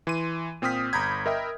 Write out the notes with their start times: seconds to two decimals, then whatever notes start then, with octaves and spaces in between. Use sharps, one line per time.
0.07 E3 C6 D#7
0.62 A#2 C4 G5 D#6 F6 B6
0.93 G1 A#5 B5 G6 G#6
1.26 A#4 D#5 E5 G5 B5